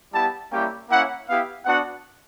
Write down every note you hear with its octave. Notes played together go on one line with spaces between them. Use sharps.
G3 B3 E4 G4 A5
G3 A#3 C#4 E4 G4 G5
A#3 C#4 E4 F#5
B3 E4 G4 F5
B3 D4 F#4 F#5